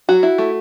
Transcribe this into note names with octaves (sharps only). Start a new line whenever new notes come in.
F#3 F#4
E4
A3